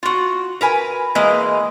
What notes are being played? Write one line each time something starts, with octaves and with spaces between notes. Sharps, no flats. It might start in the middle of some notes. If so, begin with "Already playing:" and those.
F4 F#4
A#4 B4 G#5
E3 G#3 A#3 B4 D#5